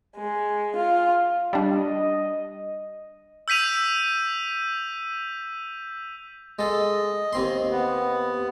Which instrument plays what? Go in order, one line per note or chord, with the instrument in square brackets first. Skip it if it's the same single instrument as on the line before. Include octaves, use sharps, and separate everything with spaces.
[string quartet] G#3
F4
[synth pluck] G3 D4 [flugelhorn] D#5
[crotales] E6 G6 B6 D#7 F7
[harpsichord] G#3 A4 [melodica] D#5
[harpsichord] D#2 C4 C6
[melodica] B3